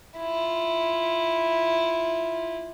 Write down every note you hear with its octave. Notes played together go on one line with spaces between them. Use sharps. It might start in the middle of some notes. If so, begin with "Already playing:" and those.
E4 F4